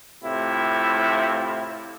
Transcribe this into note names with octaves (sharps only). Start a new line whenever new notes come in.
A2 C3 E4 F4